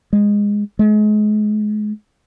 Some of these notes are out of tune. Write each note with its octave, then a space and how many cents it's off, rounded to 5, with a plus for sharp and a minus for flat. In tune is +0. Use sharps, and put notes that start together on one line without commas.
G#3 -15
G#3 +35